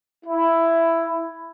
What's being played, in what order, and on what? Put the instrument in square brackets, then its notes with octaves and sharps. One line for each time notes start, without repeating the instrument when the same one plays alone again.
[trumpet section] E4